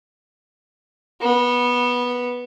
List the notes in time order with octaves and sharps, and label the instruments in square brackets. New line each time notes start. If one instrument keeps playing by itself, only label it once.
[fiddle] B3